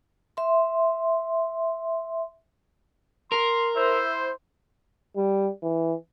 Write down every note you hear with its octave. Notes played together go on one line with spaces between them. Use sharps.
E5 C6
A#4 C6
E4 C5 E5
G3
E3